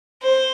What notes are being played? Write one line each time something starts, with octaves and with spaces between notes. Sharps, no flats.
C5